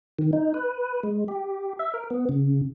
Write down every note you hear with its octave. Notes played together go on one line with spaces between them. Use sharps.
D#3
D#4
B4
G#3
G4
E5
A#4
B3
C#3